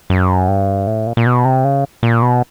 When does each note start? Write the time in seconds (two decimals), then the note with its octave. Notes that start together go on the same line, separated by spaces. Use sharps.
0.10 F#2
0.48 G2
0.87 A2
1.07 A#2
1.17 A#2
1.26 B2
1.45 C3
1.64 C#3
2.03 A#2
2.22 B2